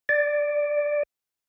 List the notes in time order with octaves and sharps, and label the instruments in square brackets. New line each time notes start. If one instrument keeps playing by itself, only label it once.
[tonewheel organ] D5